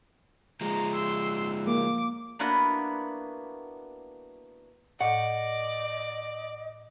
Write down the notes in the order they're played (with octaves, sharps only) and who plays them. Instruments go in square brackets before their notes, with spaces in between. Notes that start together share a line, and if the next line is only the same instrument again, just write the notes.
[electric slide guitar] F3 G#3 [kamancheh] A#5
[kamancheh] C6 E6
[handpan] A#3 [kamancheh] D6
[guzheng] A#3 B3 D4 E4 F#4 B4
[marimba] A2 [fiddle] D5 [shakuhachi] D#5 [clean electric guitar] F#5